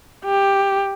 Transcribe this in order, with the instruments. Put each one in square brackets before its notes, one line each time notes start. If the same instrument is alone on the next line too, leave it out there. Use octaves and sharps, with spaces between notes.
[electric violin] G4